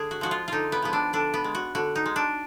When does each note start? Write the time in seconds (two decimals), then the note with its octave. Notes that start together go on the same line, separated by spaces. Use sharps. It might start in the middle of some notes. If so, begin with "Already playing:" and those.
Already playing: D3 G#4
0.11 F#4
0.21 F3 G#3 F#4
0.31 F4
0.48 D3 D#4 F4
0.72 B3
0.82 F3 G#3 B3
0.93 D4
1.13 D3 D4
1.34 B3
1.44 G#3
1.55 F#4
1.75 D3 F#4
1.95 D#4
2.06 G#3
2.16 D4